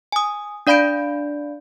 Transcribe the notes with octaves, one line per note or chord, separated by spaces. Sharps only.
G#5 D#6
D4 D5 F5 B5 G6 D7